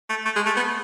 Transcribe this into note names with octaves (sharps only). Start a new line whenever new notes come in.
A3
A3
G#3
A3
B3